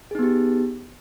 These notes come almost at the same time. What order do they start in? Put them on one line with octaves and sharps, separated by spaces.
G#4 D#4 B3 G4